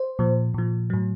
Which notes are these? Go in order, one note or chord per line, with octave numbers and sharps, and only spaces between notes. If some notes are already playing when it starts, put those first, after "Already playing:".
Already playing: C5
A#2 F3
A#2 F3
A2 F#3